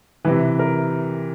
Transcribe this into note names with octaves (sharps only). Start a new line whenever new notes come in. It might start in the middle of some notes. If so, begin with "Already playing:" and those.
C3 E3 B4
A#4